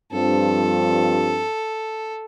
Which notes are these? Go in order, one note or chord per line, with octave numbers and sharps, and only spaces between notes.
G2 F3 C4 A4